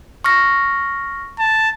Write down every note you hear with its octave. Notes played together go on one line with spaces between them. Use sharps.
C#6 F6 A#6
A5